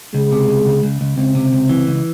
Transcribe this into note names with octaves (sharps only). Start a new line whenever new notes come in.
C#2 G#3
C3
C#2
C#2
C#2
C#2
C#2 C4
C3
C#2
E3
C#2